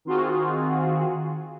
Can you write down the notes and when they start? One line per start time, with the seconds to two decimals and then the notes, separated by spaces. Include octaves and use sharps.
0.05 D#3 C4 F4 F#4 G#4